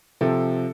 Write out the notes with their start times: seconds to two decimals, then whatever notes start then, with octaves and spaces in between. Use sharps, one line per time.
0.21 C3 F3 C4 A4